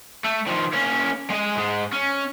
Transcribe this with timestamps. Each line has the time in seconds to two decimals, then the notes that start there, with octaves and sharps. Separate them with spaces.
0.24 A3
0.47 D#3 F3
0.73 A#3 C#4
1.30 G#3 D#5
1.55 G#2 G#3
1.93 C#4